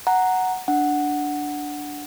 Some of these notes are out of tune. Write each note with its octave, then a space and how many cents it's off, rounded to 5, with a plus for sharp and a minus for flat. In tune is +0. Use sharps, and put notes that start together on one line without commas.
F#5 +0 A#5 +0
D4 +0 F#5 +0